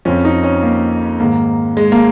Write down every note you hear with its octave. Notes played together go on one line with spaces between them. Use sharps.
F2 F3 C#4
D#4
C#4
A#3
G#2 D#3 A#3
G#3
A#3